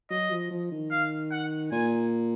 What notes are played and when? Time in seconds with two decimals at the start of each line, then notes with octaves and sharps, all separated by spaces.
0.10 F#3 D#5
0.31 F3
0.51 F3
0.71 D#3
0.91 F5
1.31 F#5
1.72 A#2 G#5